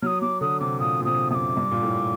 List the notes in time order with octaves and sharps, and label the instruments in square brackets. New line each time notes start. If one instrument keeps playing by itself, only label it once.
[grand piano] F#3 [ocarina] D#6 F6
[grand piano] F#3 [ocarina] D6
[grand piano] D3 [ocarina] D#6
[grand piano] C3 [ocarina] D6
[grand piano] A#2 [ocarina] D#6
[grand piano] A#2
[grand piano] C3 [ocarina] D#6
[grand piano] F#2 [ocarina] D6 D#6
[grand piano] G2
A#2
A2